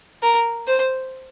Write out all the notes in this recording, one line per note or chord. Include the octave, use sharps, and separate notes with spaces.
A#4
C5